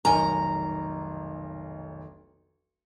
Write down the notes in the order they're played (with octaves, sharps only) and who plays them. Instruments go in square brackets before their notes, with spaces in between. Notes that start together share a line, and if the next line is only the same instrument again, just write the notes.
[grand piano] F1 B1 [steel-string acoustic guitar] D#3 A#5 [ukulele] A#4 G#5